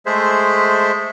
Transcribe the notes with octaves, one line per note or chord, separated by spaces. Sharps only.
G#3 A3 G#4 C5 E5